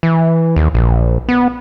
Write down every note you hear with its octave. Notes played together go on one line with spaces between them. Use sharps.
E3
D#2
A#1
B3